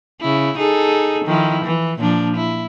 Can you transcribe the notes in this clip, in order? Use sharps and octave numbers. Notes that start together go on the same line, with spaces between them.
C#3 E4
D#4 G#4 A4
D#3 F3 E4
E3
A#2 F3 D4
E4